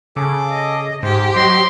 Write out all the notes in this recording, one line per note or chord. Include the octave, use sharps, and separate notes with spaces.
C#3 G#4 A4 D6
D#5
G#2 G4 C5
F#3 C5 D#5 C6